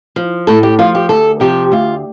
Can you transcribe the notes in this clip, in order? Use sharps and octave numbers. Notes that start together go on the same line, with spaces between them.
F3
A2 A4
G4
F3 F4
G4
D2 A4
C3 F3 G4
D2 F4